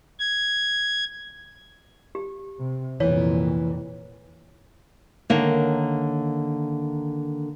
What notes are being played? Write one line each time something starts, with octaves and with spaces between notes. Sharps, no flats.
G#6
G4
C3
C2 F2 A#2 E3 B3 C#5
D3 D#3 A#3 C#5